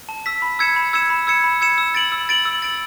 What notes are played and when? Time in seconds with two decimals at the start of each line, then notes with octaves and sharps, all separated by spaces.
0.09 A5
0.26 E6 B6
0.42 B5
0.59 E6 G#6 C#7 E7
0.76 B5
0.93 E6 G#6 C#7 E7
1.10 B5
1.27 E6 G#6 C#7 E7
1.44 B5
1.61 E6 G#6 C#7 E7
1.78 E6
1.95 A6 D7 F#7
2.12 E6
2.29 A6 D7 F#7
2.45 E6
2.62 A6 D7 F#7